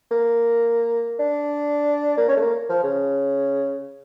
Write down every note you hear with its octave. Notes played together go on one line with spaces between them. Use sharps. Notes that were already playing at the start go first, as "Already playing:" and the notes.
A#3
D4
A#3
C#4
A3
A#3
F3
C#3